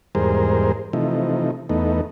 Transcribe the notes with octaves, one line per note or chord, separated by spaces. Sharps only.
E2 G#2 G3 G#4 A#4 C5
C3 E3 F3 A3 D#4
E2 A3 B3 D#4